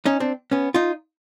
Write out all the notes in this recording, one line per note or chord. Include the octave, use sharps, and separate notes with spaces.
C#4 D#4
C4 D4
B3 C#4
D#4 F4